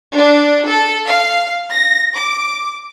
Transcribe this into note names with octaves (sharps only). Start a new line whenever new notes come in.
D4
A4
F5
A#6
D6